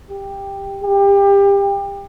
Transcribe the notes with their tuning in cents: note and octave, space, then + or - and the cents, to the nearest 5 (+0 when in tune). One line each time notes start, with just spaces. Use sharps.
G4 +10
G4 +25